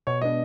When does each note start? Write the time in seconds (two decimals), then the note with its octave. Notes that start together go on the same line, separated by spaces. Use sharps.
0.07 B2 C#5
0.22 G#3 B3 D4 D#5